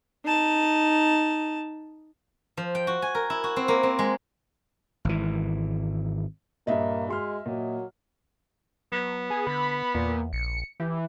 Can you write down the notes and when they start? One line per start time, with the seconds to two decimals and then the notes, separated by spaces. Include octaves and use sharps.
0.25 D#4 A5
2.57 F3
2.75 G5
2.87 F#4
3.02 G#5
3.15 A#4
3.30 E4
3.44 F#4
3.56 C4
3.68 A#3
3.83 C4
3.99 G#3
5.05 G#1 E3
6.67 G2 A#2 A#3 D#5 E5
7.08 G#3 F#4 C6 F6
7.46 A#2 F#3
8.92 F#3 B3
9.30 G#4
9.47 D3 B5
9.95 E2 A#2
10.33 A#1 C#7
10.80 E3 G4